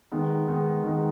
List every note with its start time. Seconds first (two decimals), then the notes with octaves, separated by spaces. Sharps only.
0.11 D#3 G#3 B3 D#4
0.48 D#3 G#3 B3 D#4
0.84 D#3 G#3 B3 D#4